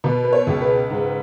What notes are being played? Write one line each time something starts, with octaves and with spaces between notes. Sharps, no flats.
B2 B4
B4
C#5
C#2
B4
G#2